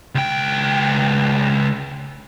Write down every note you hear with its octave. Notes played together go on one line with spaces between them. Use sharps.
C#2 G5